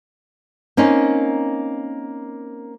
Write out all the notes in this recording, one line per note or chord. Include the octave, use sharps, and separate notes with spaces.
A#3 C4 C#4 D#4